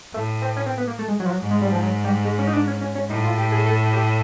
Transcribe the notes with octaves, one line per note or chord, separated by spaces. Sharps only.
A2 A3
C4
C#4
C4
B3
A#3
A3
G#3
F#3
F3
F#3
G#2
G#3
G3
F3
F#3
G3
G#3
C#4
D#4
D4
C#4
C#4
C#4
A2 D#4
F4
G4
G#4
A4
G4